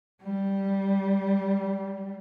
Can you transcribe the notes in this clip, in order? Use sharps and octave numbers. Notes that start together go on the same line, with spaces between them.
G3